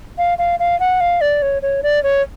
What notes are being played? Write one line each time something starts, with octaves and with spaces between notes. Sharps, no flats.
F5
F5
F5
F#5
F5
D5
C#5
C#5
D5
C#5